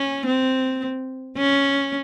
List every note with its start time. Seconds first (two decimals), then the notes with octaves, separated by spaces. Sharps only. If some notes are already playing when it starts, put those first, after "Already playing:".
Already playing: C#4
0.26 C4
1.37 C#4